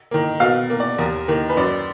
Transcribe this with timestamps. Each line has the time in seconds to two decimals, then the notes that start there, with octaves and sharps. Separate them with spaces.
0.11 D#3 A#3
0.40 B2 F5
0.70 A#3
0.80 D5
0.98 D#2 A#4
1.28 D#3 A#3
1.50 B4
1.57 F#2 D5